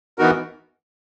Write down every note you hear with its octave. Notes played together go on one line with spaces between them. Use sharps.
E3 B3 D#4 F#4 A#4